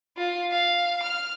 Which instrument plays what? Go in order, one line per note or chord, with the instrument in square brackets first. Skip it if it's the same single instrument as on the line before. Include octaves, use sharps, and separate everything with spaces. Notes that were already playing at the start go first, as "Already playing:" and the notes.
[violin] F4
F5
F6